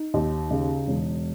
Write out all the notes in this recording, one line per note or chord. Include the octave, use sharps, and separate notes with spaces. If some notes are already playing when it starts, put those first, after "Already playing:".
Already playing: D#4
D#2
C#3
E1